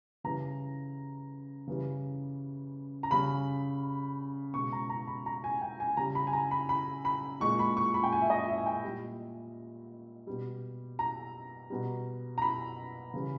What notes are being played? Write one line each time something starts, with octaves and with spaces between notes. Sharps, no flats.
C#3 E3 G3 A#5
C#3 E3 G3
A#5
C#3 G3 B5
B2 G#3 C#6
A#5
A#5
B5
A#5
G#5
G5
G#5
C#3 G3 A#5
B5
G#5
A#5
B5
B5
B5
A#2 G#3 C#6
B5
C#6
B5
G5
G#5
E5
D#5
E5
G#5
G5
A#2 G3
B2 G3
A#5
B2 G3
A#5
B5
C#3 E3 G3